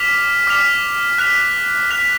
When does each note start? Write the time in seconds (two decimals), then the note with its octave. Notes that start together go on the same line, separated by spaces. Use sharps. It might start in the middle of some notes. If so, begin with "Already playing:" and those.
Already playing: D6 F6 B6 F7
0.47 D6 F6 B6 F7
1.18 F#6 B6 F7
1.91 F#6 B6 F7